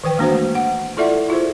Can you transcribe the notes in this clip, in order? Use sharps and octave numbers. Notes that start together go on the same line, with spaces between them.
D#3 E3 B4 G5
G#3 A#3 D4 F#4 C5
A3
F#5
E4 F4 A4 D5 E5 F#5
E4 F4 G#4 C5